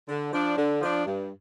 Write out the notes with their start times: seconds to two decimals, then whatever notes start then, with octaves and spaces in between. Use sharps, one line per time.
0.09 D3
0.33 F3 D4
0.58 D3
0.81 F3 D4
1.05 G2